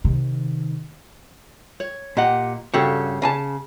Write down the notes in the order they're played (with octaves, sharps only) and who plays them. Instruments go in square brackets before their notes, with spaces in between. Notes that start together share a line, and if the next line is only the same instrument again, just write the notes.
[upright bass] C3 D#3
[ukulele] C#5
[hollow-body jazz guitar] A#2 [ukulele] G4 D#5 F#5
[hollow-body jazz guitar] G2 C#3 F#4 [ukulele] G4 A4 C#5
[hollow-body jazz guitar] C#3 G#5 A5